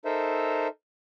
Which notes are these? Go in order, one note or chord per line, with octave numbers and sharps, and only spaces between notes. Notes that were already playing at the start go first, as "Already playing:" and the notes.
D#4 A4 A#4 C5 E5